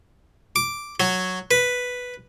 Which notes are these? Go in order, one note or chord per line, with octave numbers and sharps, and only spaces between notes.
D6
F#3
B4